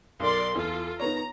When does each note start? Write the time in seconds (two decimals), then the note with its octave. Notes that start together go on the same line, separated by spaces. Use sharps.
0.20 B1 A#4 D5 C6
0.55 E2 F4 A4
1.00 D#3 B3 C#5 A#5